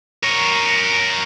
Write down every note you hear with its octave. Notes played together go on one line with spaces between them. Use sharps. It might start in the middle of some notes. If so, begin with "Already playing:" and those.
A#4 C#5